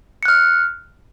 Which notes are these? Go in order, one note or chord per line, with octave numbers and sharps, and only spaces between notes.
F6 F#6 C#7